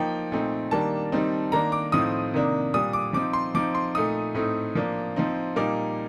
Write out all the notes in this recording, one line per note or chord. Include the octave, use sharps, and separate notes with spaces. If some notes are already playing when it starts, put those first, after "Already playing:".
Already playing: F3 A#3 D#4 G5
A#2 A3 C4 D#4
D#3 G3 A#3 D4 A5
D#3 G3 C4 D#4
D#3 A#3 D4 A#5
D6
A2 F3 C4 D#4 D#6
C3 D#3 A#3 D4
A#2 G3 D4 D#6
D6
F3 C4 D#4 D6
C6
F3 C4 D#4 D6
C6
A#2 A3 D#4 D#6
A2 A3 C4 D#4
F3 A#3 D4
F3 C4 D#4
A#2 G3 A#3 D#4 D6